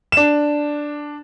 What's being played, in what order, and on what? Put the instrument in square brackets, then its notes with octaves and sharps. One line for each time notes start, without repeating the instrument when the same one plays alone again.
[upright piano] D4 E7